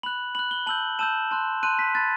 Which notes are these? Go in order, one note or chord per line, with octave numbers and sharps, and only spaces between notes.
B5 F#6 F#7
B5 F#6 F#7
G7
A5 E6 G6 F#7
A5 E6 G6 E7
A5 C6 F#6
A5 C6 F#6 D#7
B6
B5 F#6 A6